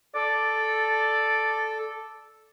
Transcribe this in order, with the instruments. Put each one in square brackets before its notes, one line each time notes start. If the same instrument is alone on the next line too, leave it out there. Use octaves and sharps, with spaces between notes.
[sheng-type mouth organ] A4 [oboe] D5